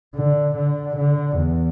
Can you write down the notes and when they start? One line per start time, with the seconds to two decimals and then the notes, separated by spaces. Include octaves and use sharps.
0.15 D3
0.56 D3
0.97 D3
1.37 E2